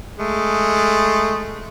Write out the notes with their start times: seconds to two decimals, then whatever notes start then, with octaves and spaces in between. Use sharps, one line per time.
0.19 G#3 A3